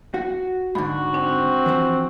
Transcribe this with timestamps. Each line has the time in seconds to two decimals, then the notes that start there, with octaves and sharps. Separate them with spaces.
0.14 F#4
0.75 G#2 D3 F#4 B5
1.14 C4 D4
1.66 E3 F3 C5